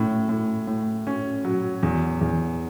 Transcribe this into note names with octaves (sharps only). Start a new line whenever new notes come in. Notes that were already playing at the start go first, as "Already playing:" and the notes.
Already playing: A2 C#4
A2
A2
C#4
F#3
E2
E2